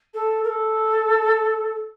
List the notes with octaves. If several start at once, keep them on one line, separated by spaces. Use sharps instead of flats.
A4
A#4
A4